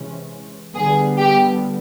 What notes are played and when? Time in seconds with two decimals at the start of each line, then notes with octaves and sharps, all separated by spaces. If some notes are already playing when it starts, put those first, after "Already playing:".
Already playing: C3 E3 G#3 C#4
0.75 D3 G3 B3 G#4
1.18 G4